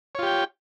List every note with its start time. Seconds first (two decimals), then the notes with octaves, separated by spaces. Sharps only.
0.15 C#5
0.19 F4
0.23 G4
0.27 G5